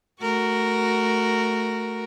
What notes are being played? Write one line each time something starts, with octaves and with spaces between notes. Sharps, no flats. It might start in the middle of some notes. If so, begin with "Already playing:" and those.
A3 F#4 A#4